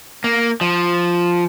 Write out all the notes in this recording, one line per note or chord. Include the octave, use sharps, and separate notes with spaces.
A#3
F3